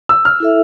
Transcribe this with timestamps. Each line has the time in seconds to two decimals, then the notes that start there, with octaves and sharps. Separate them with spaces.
0.09 E6
0.25 F6
0.40 E4 A4 E5